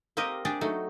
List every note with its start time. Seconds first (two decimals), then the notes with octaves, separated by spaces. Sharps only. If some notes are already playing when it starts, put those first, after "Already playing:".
0.17 A#3 C4 G4 A#4 D#5
0.45 D4 G4 G#4 D5
0.61 F#3 A3 D#4